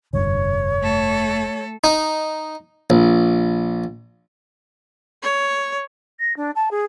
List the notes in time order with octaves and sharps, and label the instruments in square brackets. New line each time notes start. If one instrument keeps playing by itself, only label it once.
[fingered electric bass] F1 G2 D3 [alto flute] C#5
[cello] A3 A4
[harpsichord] D#4
A#1
[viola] C#5
[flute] A#6
D4
A5
G#4